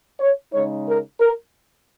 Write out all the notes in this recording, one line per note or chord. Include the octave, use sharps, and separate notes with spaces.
C#5
C#3 G#3 D#4 C#5
A#4
A#4